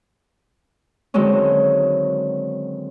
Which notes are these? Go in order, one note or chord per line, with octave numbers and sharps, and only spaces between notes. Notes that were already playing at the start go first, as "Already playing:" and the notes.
D3 D#3 F#3 G#3 C4 C#4